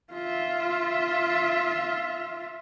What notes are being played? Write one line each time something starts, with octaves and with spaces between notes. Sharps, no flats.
F4 E5